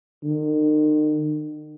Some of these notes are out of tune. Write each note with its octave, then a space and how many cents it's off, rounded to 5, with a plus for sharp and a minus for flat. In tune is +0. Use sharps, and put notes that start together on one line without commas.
D#3 -40